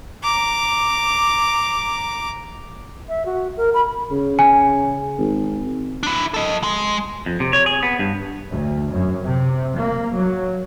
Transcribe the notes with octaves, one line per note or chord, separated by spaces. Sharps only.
A#5 D6
E5
F#4
A#4
B5
C#3
G#5
G#1
D4 E4
A4 D#5
G#3
F2
C3
C#5
G#4
B3
G2
D2
F#2
C3
A#3
F#3